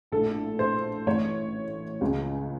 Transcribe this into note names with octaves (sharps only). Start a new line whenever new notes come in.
A#1 A2 A4
C5
A1 A2 C#5
C#2 C#3